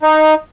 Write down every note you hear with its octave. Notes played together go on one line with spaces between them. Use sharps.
D#4